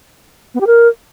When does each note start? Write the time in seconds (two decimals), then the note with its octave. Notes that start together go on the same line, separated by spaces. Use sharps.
0.54 B3
0.61 G4
0.67 A#4